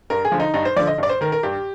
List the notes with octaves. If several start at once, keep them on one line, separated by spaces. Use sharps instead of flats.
G2 A#4
G#4
D3 F3
D#4
G2 D#4
C5
D3 F3 D5
D#5
G2 D5
C5
D#3 A#4
A#4
G2 G4